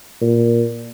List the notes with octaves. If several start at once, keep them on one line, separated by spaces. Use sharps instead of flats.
A#2